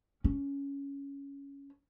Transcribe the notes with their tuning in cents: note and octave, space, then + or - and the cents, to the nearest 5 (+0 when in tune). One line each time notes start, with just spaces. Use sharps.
C#4 +10